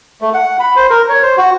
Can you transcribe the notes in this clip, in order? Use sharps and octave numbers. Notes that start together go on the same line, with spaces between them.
A3
F#5
B5
C5
A#4
C#5
C5
F#4